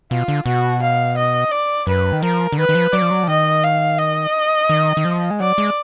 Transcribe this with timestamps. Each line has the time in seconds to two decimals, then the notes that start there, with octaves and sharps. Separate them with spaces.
0.11 B2 F4
0.28 D3
0.45 B2 F#4
0.82 F5
1.17 D#5
1.51 D5
1.87 F#2 B4
2.13 D#3
2.22 F3 A#4
2.52 D3
2.58 D#3 B4
2.69 D#3
2.75 F3
2.93 F#3 D5
3.02 F3
3.11 F#3
3.23 F3
3.28 D#3 D#5
3.64 F5
3.98 D#5
4.69 D#3
4.97 D#3
5.05 F3
5.30 G#3
5.40 F#3 D5
5.58 G#3